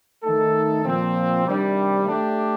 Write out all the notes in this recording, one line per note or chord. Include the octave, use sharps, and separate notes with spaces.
D#3 A3 D#4 A4
A#2 F3 C4
C3 D#3 G3 D4
A3 D4 G4